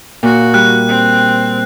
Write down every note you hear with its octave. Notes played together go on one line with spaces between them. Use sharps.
A#2 F#4
G3 F#6
C4